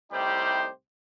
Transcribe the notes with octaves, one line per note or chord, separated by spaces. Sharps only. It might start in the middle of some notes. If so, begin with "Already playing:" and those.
C2 A2 G3 D#4 G4 C5